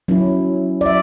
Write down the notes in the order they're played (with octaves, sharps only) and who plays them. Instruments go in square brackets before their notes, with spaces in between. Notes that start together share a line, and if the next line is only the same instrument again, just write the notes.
[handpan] F#3 C#4 E4
D5
F#3 E5